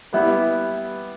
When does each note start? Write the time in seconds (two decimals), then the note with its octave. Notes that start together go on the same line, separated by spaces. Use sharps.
0.13 G3 B3 E4 G4 B4